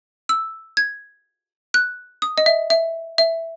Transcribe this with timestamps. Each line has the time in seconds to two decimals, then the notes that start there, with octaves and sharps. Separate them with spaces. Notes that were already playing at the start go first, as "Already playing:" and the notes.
0.29 E6
0.77 G#6
1.74 F#6
2.22 D#6
2.38 D#5
2.46 E5
2.70 E5
3.18 E5